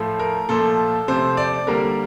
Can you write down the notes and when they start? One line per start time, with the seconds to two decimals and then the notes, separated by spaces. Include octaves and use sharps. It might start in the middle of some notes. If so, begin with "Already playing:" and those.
Already playing: A2 F3 A3
0.19 A#4
0.49 A#2 F3 A3 A4
1.08 C3 F3 A3 C5
1.37 D5
1.67 D3 G3 A#3 A#4